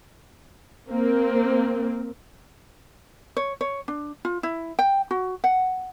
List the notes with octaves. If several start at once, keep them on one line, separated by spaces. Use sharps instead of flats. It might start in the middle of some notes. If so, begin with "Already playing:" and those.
A#3 C4
C#5
C#5
D4
F4
E4
G5
F#4
F#5